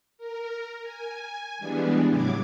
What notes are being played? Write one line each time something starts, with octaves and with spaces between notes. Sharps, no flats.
A#4
G#5
E3 G3 G#3 B3 D4
A2 C#3 F#3 D6 G#6